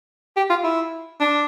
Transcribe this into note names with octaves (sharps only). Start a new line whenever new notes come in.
G4
F4
E4
D4